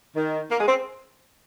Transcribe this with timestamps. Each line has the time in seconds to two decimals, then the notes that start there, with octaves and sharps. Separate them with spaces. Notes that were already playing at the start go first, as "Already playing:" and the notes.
0.16 D#3
0.51 A#3
0.60 G#3
0.68 C4